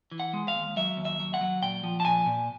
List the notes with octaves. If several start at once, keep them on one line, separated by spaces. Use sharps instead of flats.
E3
F#5
G#3
F5
D#2
F#3 E5
D#2
E5
F#3
F#5
F#3
A#2 G5
F3
A5
A#2 G#5
A#2